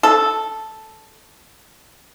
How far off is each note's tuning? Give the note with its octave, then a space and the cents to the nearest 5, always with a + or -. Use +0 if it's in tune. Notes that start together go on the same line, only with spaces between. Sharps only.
A4 -5